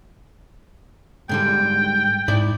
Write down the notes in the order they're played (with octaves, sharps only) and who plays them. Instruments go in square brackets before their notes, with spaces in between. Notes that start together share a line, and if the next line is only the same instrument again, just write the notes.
[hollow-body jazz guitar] G#2 D3 G3 [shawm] G5
[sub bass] G#2 [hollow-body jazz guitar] E4 D5